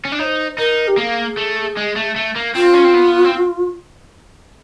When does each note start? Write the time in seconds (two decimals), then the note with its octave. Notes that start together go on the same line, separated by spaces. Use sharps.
0.05 C#4
0.12 D4
0.19 D#4 C#5
0.24 C5
0.58 D#4 A#4
0.88 G4
0.97 A#3 G#4
1.37 A3
1.77 G#3
1.96 A3
2.16 A3
2.36 A#3
2.55 C4 F4
2.74 C#4
2.85 C4
2.94 B3
3.24 C4